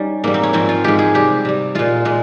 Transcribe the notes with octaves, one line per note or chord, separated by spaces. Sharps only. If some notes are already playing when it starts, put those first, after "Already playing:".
Already playing: G3 C#4 D#4
G#2 G3 A#3
C4
C#4
G#2 F3 G#3 C4
F4
G#2 F3 G#3 G4
G#4
C3 G3 G4
C3 G3
A#2 G#3 F4
A#2 G#3